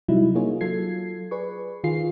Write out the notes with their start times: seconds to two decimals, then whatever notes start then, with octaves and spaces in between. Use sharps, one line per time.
0.08 C3 F#3 G3 D#4 E4
0.35 A#3 D#4 F4 G#4 C#5
0.61 F#3 F4 A4 G#6 C7
1.31 G#4 B4 D5 C#6
1.84 D#3 F4 G#4 C7